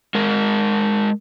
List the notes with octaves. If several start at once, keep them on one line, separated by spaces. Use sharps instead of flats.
G#3 A#4